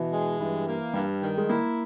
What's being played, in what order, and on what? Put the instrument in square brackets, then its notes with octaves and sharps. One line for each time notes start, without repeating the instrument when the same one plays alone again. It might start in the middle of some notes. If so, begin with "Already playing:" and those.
Already playing: [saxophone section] B2 [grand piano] E3
[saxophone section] G#3
[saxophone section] G2 [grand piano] E3
[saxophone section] A#3
[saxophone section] G2 [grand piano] G3
[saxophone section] D#3
[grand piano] G#3
[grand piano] A#3 [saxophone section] E4